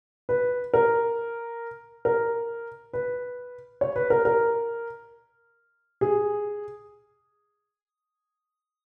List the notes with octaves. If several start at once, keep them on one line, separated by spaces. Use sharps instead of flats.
B4
A#4
A#4
B4
C#5
B4
A#4
A#4
G#4